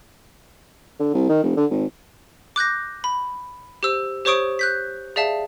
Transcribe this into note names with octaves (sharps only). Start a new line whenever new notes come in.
D3
C2
D#3
F1
D3
G#1
D6 F#6 G6 A#6
B5
G4 C5 E6
G4 C5 C#5 C#6 D#6 D7
F#6 G6 B6
G#4 D5 E5 F5 A5